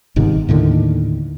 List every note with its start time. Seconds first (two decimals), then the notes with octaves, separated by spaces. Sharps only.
0.16 G1 G#2 C3 D#3
0.48 D#2 A2 D3 D#3